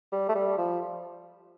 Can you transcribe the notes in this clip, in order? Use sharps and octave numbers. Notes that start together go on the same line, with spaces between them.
G3
A3
G3
F3